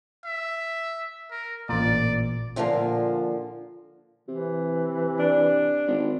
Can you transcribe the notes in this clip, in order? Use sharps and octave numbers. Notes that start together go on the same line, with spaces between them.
E5
A#4
A1 A#2 D5
A#2 D3 F3 G3 A#3
C3 E3
D4
G#1